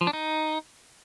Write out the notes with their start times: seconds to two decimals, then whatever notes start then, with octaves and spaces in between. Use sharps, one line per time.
0.01 F3
0.07 D4
0.13 D#4